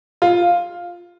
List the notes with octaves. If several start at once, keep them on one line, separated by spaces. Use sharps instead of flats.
F4